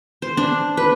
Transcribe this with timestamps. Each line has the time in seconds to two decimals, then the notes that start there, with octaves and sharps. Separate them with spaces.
0.22 C5
0.37 D4
0.77 B4